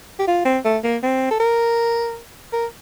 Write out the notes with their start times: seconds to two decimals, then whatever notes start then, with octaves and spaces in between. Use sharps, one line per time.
0.19 G4
0.27 F4
0.45 C4
0.65 A3
0.84 A#3
1.03 C4
1.31 A4
1.40 A#4
2.53 A#4